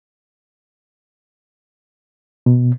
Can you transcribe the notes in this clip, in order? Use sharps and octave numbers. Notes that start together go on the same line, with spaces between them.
B2